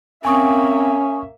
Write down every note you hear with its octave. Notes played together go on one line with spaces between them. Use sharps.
A#3 C4 C#4 E5 G#5 C#6 D#6